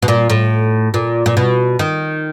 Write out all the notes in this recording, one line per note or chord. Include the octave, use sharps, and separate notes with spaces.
B2
A#2
A2
A#2
A#2
B2
D#3